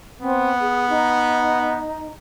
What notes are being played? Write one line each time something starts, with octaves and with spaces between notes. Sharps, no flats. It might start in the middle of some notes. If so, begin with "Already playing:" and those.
B3 C4
G#4
D#4